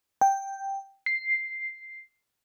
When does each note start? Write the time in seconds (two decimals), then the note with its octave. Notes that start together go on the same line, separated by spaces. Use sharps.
0.21 G5
1.06 C7